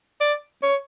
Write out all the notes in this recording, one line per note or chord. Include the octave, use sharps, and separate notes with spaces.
D5
C#5